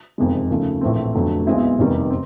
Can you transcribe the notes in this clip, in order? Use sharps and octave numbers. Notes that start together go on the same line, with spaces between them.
F#1 F2 C3 D#3 G#3
D#2 C#3 F3 A3
A#1 A2 E3 A3 C4
F1 F2 D3 F#3 A3
B1 B2 G#3 C4 E4
F1 E2 C3 D#3 G3
C4